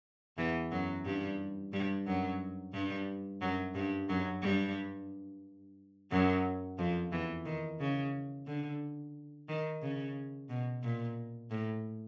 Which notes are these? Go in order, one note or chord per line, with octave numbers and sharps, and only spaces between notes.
E2 E3
F#2 F#3
G2 G3
G2 G3
F#2 F#3
G2 G3
F#2 F#3
G2 G3
F#2 F#3
G2 G3
F#2 F#3
F2 F3
E2 E3
D#3
C#3
D3
D#3
C#3
B2
A#2
A2